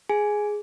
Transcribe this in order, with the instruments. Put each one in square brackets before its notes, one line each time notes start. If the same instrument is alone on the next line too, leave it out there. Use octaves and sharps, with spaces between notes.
[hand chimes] G#4 G#5